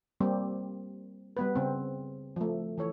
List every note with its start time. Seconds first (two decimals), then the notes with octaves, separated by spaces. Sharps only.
0.20 G3 A#3 C4 G4
1.37 G3 B3 B4
1.55 C#3 C4
2.36 F3 A3
2.78 E3 A4 C#5